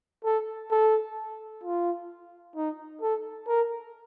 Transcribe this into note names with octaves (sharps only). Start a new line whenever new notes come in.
A4
A4
F4
D#4
A4
A#4